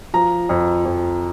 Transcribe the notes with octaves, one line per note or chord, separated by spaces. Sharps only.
F3 A#5
F2
F2